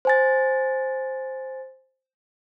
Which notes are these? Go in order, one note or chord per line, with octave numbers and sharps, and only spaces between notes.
C5 G#5 A6